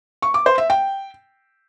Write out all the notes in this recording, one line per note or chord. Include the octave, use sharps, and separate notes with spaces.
C#6
D6
C5
E5
G5